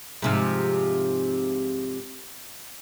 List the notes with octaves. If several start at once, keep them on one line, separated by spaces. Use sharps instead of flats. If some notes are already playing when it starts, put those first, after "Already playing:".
G#2 C3 F3